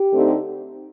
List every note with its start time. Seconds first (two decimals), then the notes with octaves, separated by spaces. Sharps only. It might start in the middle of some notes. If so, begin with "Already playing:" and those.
Already playing: G4
0.13 D3 A3 C4 D#4